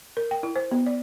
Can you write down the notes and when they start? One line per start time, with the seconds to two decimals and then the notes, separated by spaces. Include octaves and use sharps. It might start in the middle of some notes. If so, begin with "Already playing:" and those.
0.17 A#4
0.31 G5
0.43 E4
0.56 C5
0.71 B3
0.86 D5